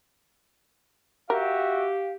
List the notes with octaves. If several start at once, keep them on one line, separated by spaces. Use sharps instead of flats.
F#4 G4 A#4 E5 F5